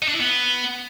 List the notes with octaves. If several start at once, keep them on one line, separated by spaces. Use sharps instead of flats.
D#4
D4
E4
B3